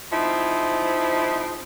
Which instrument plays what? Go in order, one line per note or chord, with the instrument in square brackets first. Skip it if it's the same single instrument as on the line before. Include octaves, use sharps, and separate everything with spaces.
[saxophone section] F3 G#3 C4 D#4 E4